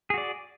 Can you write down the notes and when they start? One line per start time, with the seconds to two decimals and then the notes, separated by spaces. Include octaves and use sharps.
0.10 G#4
0.14 F#4
0.18 D5